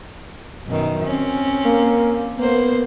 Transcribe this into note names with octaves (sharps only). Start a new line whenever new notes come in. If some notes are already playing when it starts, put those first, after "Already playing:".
F#2 B2 D#3
C4 C#4
A#3
A#3 B3 C5